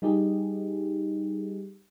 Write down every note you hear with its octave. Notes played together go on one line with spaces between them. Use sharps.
G3 D#4 G4 G#4